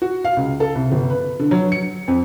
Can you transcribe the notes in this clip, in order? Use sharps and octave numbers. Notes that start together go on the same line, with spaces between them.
F#4
F5
C#2
A4
C2
G1
B4
D3
F#3
C#7
F2